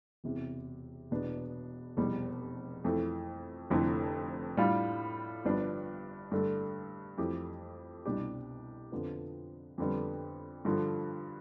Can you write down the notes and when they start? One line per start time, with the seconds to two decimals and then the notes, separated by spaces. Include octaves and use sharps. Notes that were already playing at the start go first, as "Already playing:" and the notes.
0.24 E1 E2 C3
1.11 E1 E2 B2 B3 D4
1.97 F1 E2 B2 G3
2.84 F2 E3 A3
3.70 F1 F2 D3 A3 E4
4.57 A2 G3 D4 F4
5.45 G1 G2 F3 B3 D4
6.32 G2 D3 A3 D4 A4
7.18 F2 E3 A3 E4 G4
8.05 C2 B2 G3 D4 G4
8.92 F2 D3 F3 B3
9.78 F2 D3 G3 B3
10.65 G2 D3 F3